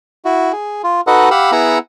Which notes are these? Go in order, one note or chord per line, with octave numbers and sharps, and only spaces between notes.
E4 F#4
G#4
F4
D#4 F#4 A4 B4 D#5 F#5
G4 F5 F#5 B5 E6
B3 E4 G#4 F#5 A#5 E6